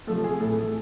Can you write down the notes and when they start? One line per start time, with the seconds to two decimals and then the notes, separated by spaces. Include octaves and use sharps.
0.07 C3 F3 A3 A4
0.24 G#4
0.40 A2 E3 A3 A4